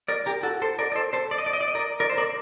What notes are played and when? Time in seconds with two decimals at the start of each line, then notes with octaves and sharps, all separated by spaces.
0.08 A#4 D5
0.26 G4 A#4
0.43 F#4 A4
0.62 A4 C5
0.79 A#4 D5
0.92 D5
0.95 A4 C5
1.13 A4 C5
1.31 D5
1.38 D#5
1.46 D5
1.53 D#5
1.61 D5
1.68 D#5
1.75 A#4 D5
2.00 A#4 D5
2.10 C5
2.17 A#4 D5